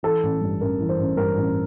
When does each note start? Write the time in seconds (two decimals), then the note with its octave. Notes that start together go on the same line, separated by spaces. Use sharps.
0.03 E3 A4
0.23 A1
0.41 G2
0.60 A1 A#4
0.80 E3
0.89 C5
0.99 A1
1.17 G2 A#4
1.37 A1